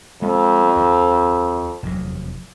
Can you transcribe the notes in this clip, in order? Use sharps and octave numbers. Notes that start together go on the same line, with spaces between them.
F2 G#3 B3
D#2
F1 E2 F#3